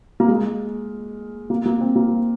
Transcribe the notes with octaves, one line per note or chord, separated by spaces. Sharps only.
A#3
G#3
A#3
A#3
C4
A#3